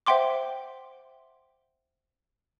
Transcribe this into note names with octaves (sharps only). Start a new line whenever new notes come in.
C5 E5 F#5 G5 C6 D6